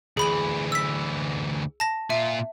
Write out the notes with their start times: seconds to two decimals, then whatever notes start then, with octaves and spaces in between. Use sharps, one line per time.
0.17 D2 E3 G#4 B5 F#7
0.72 E6 B6
1.80 A5 A#6
2.10 A#2 F4 E5